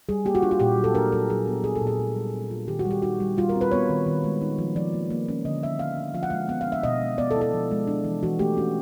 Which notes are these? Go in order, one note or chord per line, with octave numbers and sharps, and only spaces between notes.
G3 G#4
A#3 G4
F#4
D4 F4
F#4
A#2 G4
F#3
A4
D4 A#4
F#3 A4
F#3 G#4
B3
B3 G#4
A4
A#2
G#4
A#2
G3
C4
F4
D#3 G4
F#4
G3
G4
D#4 F#4
G3
G3 F4
A#4
C4
B4
B3 C#5
D#3
D#3
G#3
D#4
F3
F3 D5
A#3
A#3
C#4
D3 D#5
F3 E5
B3 F5
D4
F3 F5
F#5
G#3 F5
B3 F#5
F5
D4 E5
B2 D#5
G#3
B3 D5
A4
E4
A4
F3
G#3
D4
E3
E3 F#4
A3 G4
C#4 F#4